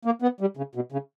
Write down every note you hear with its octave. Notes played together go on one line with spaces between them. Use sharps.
A#3
B3
G3
C#3
B2
C#3